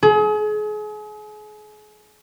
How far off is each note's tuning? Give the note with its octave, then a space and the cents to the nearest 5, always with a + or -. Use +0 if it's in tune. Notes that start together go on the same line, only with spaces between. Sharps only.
G#4 +35